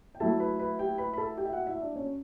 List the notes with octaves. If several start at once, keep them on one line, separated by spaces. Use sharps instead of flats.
G5
F#3 A3 E4 A4 A5
B4 B5
B4 B5
G4 G5
B4 B5
B5
A4 A5
G4 G5
E5
F#4 F#5
E4 E5
D4 D5
C#4 C#5